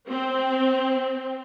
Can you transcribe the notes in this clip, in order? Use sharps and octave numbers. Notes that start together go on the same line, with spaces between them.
C4